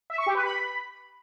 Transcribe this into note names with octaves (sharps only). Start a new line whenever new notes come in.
E5
C#6
G4
B4
B5